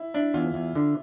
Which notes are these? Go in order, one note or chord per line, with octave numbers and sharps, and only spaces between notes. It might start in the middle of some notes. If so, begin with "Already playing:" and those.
Already playing: E4
D4 E4
E2 F4
E2
D3